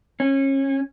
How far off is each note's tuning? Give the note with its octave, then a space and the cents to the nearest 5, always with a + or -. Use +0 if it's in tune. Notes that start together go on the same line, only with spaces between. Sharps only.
C#4 -25